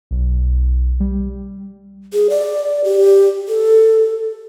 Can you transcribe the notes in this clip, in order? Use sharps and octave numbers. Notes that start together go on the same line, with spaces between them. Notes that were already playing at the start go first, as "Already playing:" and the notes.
B1
G3
G#4
D5
G4
A4